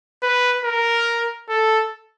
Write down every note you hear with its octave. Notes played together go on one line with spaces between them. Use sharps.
B4
A#4
A4